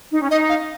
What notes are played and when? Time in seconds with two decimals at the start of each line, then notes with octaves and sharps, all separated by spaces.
0.11 D#4
0.21 C#4
0.30 D#4 D#5
0.49 F5